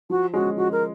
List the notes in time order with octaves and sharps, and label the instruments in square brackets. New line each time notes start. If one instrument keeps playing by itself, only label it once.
[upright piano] F3 [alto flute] F#4
[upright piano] G#3 C#4 [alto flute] F#4
[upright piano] F3 [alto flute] F#4
[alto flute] A#4